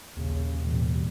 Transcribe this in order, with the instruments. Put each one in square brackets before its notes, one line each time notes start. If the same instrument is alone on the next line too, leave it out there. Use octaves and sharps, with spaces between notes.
[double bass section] A#1 C#3 [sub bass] D#2
[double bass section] A1 B2 G3